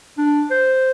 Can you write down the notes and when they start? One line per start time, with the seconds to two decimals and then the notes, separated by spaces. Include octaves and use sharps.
0.18 D4
0.51 C5